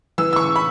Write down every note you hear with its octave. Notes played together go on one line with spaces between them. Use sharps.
E3 E6
E6
C#6
B5